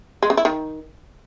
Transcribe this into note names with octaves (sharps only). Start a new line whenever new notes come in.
G#3
C#3
E4
D#3